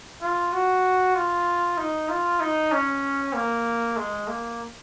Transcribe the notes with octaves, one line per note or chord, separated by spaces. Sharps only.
F4
F#4
F4
D#4
F4
D#4
C#4
A#3
G#3
A#3